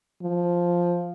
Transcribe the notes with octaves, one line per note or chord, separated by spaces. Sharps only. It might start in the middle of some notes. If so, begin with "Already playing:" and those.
F3